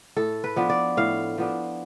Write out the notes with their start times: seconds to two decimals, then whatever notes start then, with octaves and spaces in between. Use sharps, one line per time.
0.17 A2 A4
0.44 B4
0.56 F3 B3 D4
0.70 D5
0.97 A2 F5
1.38 F3 B3 D4